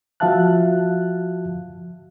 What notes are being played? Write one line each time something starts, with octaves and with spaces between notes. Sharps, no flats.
F3 F#4 E5 F5 A5 F#6